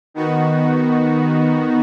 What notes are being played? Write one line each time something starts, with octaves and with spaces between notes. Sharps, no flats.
D#3 B3 D#4 F#4